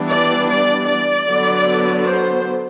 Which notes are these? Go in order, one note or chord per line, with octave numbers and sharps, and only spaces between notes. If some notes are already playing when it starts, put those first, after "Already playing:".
Already playing: E3 G3 B3 D4
D5
D5
D5
D3 F#3 B3
C5